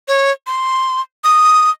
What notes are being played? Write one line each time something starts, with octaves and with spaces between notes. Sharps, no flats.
C#5
C6
D#6